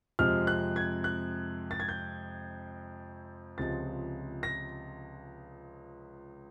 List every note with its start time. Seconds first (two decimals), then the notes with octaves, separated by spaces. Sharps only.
0.19 F2 C3 F3 G#3 F6
0.47 F#6
0.76 G#6
1.04 F#6
1.71 A6
1.80 G#6
1.88 G6
3.58 C#2 C3 F3 G#3 A6
4.43 A#6